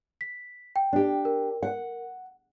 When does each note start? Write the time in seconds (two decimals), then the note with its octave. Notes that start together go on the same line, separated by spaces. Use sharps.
0.21 B6
0.76 G5
0.93 D4 G4
1.25 A#4
1.63 F#5